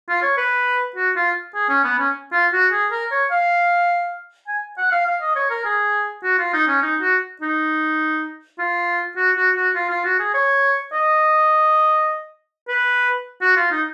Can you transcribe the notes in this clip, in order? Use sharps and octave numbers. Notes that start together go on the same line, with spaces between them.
F4
C#5
B4
F#4
F4
G#4
C#4
B3
C#4
F4
F#4
G#4
A#4
C#5
F5
G#5
F#5
F5
F5
D#5
C#5
A#4
G#4
F#4
F4
D#4
C#4
D#4
F#4
D#4
F4
F#4
F#4
F#4
F4
F4
F#4
G#4
C#5
D#5
B4
F#4
F4
D#4